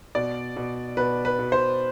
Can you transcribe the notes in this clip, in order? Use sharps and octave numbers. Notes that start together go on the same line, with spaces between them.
B2 D5
B2
B2 B4
B4
B2
C5